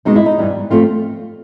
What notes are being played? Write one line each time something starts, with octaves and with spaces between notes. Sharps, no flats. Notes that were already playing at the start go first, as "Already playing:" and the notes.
B2 G#3 C4 D#4
E4
D#4
G2 E3 G3
F3 A3 C4 F4